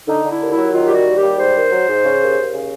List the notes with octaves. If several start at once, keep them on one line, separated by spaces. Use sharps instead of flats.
D3 D#4
D3
E4
D#2
E4
F#3
D#3 F4
G3 G4
F#4
D#2
G4
G3
G#2 C5
D#3
F#3
G#2
C#3
D#2
D#2
C#3